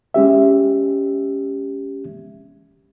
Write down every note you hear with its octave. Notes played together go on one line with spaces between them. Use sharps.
G#3 C#4 G4 E5